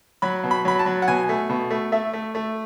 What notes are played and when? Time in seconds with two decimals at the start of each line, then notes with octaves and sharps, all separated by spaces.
0.22 F#3 B5
0.44 B2
0.51 B5
0.65 F#3 B5
0.79 A5
0.86 F#3
1.02 F#5
1.08 B2 G#5
1.29 A3
1.49 B2
1.70 A3
1.92 A3 E5
2.13 A3
2.35 A3